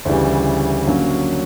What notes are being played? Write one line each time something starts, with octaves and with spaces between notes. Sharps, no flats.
D2 C#3 E3 G3
D3 F#3 A#3 C#4